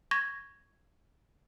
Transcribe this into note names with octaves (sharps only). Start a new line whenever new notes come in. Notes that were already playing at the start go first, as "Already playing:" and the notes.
C#6 G#6 A#6